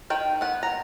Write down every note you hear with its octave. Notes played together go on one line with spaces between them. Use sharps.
D#3 G5
B3 F#5
A#5